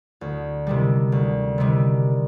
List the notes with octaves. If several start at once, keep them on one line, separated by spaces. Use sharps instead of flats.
D2
C3 D#3 G3
D2
C3 D#3 G3